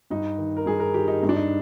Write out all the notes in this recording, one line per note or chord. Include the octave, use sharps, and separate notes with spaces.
G2 D#4
D#3
A#4
G2 G#4
A#4
D#3 G4
D#4
G2 D#4
D4
D#4